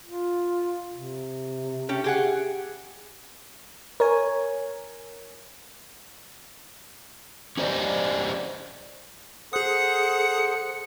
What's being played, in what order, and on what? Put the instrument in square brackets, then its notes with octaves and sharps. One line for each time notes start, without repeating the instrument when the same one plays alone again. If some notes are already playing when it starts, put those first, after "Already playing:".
[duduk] F4
C3
[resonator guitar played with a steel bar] A3 C#4 G4
G4 G#4 F#5
[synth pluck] A#4 C#5 G#5
[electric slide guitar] C#4 G4 C5 D5 D#5
[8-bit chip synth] G#4 D#6 [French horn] A4 [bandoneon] C5 F#5 [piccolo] C#7